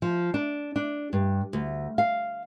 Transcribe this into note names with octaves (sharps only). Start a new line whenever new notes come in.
F3
D4
D4
G2
D2
F5